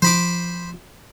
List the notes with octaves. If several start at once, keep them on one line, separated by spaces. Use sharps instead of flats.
F3 C5 B5 D6